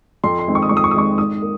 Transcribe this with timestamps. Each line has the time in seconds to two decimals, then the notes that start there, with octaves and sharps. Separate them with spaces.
0.24 F2 C6
0.39 C6
0.48 D#3 G#3 C4
0.55 C#6
0.62 D#6
0.69 F2 C#6
0.77 D#6
0.84 C#6
0.91 D#6
0.95 D#3 G#3 C4 C#6
1.18 G#2 D#6
1.42 A#3